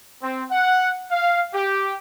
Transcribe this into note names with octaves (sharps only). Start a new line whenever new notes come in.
C4
F#5
F5
G4